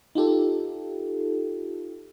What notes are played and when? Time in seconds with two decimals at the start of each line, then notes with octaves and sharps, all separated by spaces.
0.15 D#4 F4 G4 A4